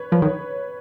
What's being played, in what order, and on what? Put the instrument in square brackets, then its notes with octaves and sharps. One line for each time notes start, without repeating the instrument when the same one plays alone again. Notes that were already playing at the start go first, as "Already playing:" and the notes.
Already playing: [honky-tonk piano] B4 C#5
[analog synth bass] F3 [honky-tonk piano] B4
[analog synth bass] D#3
[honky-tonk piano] C#5